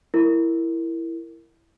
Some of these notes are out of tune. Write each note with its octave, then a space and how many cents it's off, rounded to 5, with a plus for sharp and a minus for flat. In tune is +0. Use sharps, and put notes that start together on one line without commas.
E4 +10 A#4 -10